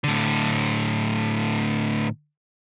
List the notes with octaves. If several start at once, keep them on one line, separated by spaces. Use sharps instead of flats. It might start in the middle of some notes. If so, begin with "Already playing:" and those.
A2 D3